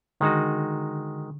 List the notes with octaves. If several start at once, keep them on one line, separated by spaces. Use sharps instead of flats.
D3 D#3 G#3 D#4 F#4